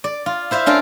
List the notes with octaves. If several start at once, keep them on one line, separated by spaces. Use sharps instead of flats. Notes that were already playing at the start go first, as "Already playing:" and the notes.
D5
F4
E4 C5 E5 F5
C#4 D4 F4 A#4